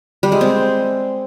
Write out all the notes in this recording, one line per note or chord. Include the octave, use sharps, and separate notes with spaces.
G3
G#3
C4